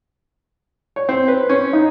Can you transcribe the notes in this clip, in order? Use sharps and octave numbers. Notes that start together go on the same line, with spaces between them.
C#5
C4
B4
C#4
D#4